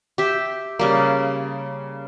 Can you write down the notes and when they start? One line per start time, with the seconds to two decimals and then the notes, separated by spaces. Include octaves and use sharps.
0.18 G4 E5
0.79 C#3 G3 A#3